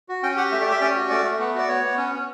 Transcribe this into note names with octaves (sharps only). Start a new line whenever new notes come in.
F#4
C#4 G5
G4 F#5
A3 E5
D5
G4 E5
C#4 D5
F#4
A3 D5
A3
B3
F#4 D5
B3 C#5
B3
C#4
C#4